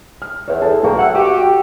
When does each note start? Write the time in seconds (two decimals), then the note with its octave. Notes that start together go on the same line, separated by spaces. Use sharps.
0.22 F6
0.48 E2 C#5
0.62 G#4 A4 A5
0.83 B1 A#3 G5 C#6
0.98 E5 F#5 E6
1.14 F#4 G4